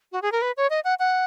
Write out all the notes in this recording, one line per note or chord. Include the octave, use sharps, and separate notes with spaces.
F#4
G#4
A#4
B4
C#5
D#5
F#5
F#5